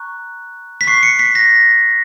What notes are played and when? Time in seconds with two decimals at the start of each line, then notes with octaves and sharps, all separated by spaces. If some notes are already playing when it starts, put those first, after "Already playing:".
Already playing: A#5 C#6 F#6
0.81 B6
0.87 C#6 F#6 C7
1.03 C#7
1.19 B6
1.35 A#6